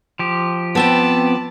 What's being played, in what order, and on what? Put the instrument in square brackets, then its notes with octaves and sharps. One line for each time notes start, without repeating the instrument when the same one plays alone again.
[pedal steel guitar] F3 G4
[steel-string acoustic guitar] B3 C4 G5 [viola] A5 B5